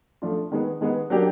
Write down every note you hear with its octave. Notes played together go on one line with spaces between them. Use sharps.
F3 A3 D4 F4
D#3 G#3 B3
D#3 G#3 B3
F#3 A#3 D4 G4